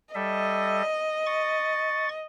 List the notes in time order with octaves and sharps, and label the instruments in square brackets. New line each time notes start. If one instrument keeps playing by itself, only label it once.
[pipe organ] G3 A4 E5 [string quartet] D#5
[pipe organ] C#6 A6